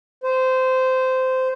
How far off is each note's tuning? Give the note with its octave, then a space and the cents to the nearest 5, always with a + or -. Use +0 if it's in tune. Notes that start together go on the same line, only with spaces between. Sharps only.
C5 -15